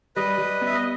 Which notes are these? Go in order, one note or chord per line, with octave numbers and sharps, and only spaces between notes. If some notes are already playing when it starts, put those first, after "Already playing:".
G3 B4 D#5
G3
B3 E5
D#5